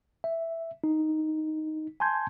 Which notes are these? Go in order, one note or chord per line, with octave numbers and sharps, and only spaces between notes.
E5
D#4
G#5 A5 C6 G6 G#6